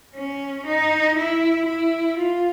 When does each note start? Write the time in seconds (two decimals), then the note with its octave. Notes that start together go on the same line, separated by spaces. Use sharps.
0.15 C#4
0.66 D#4
1.17 E4
1.66 E4
2.17 F4